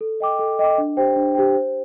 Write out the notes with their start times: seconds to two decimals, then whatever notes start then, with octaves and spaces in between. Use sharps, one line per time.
0.01 A4
0.20 D#5 G5 D6
0.39 A4
0.59 D#5 G5 D6
0.78 D4
0.97 G4 C5 G5
1.16 D4
1.35 G4 C5 G5
1.54 C5